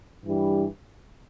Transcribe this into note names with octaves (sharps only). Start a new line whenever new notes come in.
G2 E3 G3